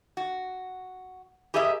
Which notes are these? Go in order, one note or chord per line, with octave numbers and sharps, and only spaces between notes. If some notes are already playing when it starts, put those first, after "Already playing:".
F#4
G4 G#4 A#4 D#5 E5